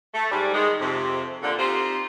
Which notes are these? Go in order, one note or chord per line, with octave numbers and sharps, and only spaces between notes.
A3
G#2 G3
D#3 G#3
F2 C3
A#2 D3
C4 D#4 F4 G4 C5